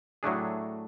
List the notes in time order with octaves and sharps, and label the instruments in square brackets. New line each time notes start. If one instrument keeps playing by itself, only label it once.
[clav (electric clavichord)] A2 F#3 A3 D4 G#4